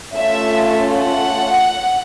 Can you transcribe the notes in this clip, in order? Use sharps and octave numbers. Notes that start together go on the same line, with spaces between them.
A3 C#4 F4 A4 E5
F#5